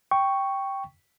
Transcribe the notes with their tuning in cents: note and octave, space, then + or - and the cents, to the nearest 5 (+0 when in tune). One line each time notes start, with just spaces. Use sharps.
G5 +0 C#6 +0